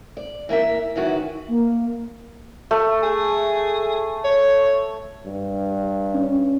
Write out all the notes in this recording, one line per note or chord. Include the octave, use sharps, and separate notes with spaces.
D5
E3 A#3 A#4 E5
F#2 D#3 E3 F#4
A#3
A3
G#4
C#5
G2
C#4